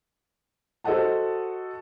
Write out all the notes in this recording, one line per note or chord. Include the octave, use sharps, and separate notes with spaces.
F#4 A4 C5 D#5 F#5 A5